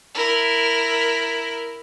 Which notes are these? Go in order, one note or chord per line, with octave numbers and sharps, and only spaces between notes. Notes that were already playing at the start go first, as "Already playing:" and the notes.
E4 A#4